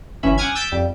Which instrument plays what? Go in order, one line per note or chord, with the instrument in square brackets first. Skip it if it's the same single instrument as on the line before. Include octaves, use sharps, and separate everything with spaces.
[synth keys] G1 G2 E3 C#4 E5 B5
F#5 G#5 D6 D#6 F6 G#6
E6 G6 A6 B6 D7
F2 G3